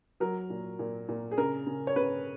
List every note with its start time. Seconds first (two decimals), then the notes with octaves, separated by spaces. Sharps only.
0.20 F#3 A#4
0.50 A#2
0.79 A#2
1.09 A#2
1.31 G#4
1.38 C#3 A#4
1.67 C#3
1.87 C#5
1.96 C#3 B4